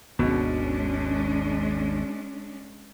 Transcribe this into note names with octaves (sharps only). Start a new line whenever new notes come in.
G#1 D#2 B2 G#3 C#4 D4